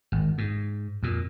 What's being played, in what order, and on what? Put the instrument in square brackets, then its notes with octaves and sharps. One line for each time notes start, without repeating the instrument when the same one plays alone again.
[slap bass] G#1
G#2
F2 A#2